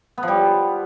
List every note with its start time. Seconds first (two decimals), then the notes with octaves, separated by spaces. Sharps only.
0.18 B3
0.23 F3
0.28 G3